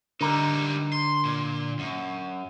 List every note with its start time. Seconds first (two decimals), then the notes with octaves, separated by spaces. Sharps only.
0.21 D3 G3 D#4 A#4
0.93 C6
1.25 A#2
1.79 F#2